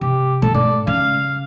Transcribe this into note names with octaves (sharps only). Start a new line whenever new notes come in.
C3 G4
A#2 G3 A4
A2 D5
C#3 F5